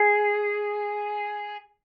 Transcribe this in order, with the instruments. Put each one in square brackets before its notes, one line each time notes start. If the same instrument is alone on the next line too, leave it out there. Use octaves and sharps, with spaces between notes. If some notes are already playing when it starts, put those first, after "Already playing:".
Already playing: [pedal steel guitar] G#4